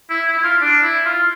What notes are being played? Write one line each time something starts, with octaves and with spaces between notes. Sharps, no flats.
E4
E4
E4
F4
D4
E4
F4